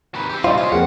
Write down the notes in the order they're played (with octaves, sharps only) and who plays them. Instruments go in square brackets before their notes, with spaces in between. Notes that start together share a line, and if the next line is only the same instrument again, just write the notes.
[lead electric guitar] D#3 B4
C4 G4
[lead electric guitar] B2 G3 [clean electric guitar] F4 [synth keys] C5 D5 D#5
[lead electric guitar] C#4 G#4 [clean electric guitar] F4
[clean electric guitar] F2 A#3 C4 [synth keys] G#4 A#4 [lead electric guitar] F#5